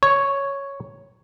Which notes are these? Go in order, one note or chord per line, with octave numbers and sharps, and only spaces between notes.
C#5